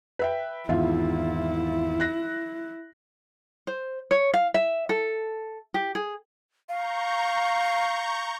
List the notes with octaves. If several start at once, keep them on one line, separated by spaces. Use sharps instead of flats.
B4 E5 G5
G#1 E2 E4 F4 E5
F#6 A#6
C5
C#5
F5
E5
A4
G4
G#4
F5 A#5 C#6 G6